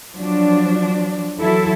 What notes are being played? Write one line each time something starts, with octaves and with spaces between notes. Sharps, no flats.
F3 F#3 D4
E3 F#3 E4 A4